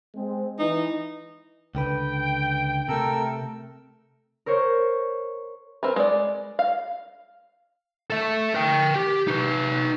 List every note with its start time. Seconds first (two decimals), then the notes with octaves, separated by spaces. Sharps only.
0.15 G#3 C4
0.59 E3 D#4
1.75 C#2 D3 B4 G5
2.89 C3 A3 A4 A#4 E6
4.46 A#4 C5 C#5 C#6
5.83 C4 A#4 B4
5.96 G#3 D5
6.59 F5
8.10 A4 E5
8.55 A#4 G5
8.96 G4
9.28 D#4 B4